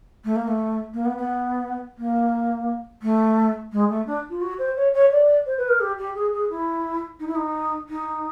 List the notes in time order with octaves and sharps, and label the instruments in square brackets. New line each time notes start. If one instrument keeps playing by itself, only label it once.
[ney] A3
A#3
A3
A#3
B3
B3
A#3
A3
G#3
A3
D4
F4
F#4
C5
C#5
C#5
D5
C5
B4
A#4
G4
G4
G#4
G#4
E4
D#4
E4
D#4
D#4